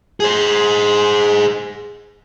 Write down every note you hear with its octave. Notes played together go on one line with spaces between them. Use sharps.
G#4 C5